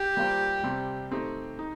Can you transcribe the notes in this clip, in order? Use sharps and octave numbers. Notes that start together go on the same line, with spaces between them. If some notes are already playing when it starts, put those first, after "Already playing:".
Already playing: G4
G3 A#3 F4 C5
C3 G3 C4
A3 C4 D#4 G4
D#4